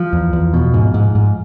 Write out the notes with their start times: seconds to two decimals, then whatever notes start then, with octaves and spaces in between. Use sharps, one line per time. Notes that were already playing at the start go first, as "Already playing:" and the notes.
Already playing: F3
0.13 E2
0.33 E2
0.54 B2
0.74 G#2
0.94 G#2
1.15 G#2